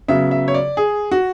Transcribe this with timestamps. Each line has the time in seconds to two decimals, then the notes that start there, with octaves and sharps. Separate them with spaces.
0.08 C#3 F#3 B3 E5
0.31 E5
0.48 C#5
0.54 D5
0.77 G#4
1.11 F#4